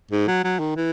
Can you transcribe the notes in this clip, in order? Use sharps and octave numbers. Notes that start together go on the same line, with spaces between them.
G#2
F#3
F#3
D#3
E3